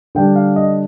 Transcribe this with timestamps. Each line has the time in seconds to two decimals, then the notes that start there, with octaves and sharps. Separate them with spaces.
0.15 D3 G3 D4 G5
0.35 F5
0.56 D#5